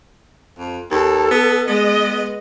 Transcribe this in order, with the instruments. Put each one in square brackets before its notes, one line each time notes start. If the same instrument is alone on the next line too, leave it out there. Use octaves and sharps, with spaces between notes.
[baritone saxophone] F2
[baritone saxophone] D#2 [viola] A4
[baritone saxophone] B3
[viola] G#3 D#5 [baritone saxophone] B3